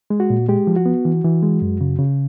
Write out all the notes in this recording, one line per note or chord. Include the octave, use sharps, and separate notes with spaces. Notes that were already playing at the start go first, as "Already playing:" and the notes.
G#3
F#4
A#2
G#3 G4
F3
F#4
B3
E3
E3
G#3
F#2
C#3
C#3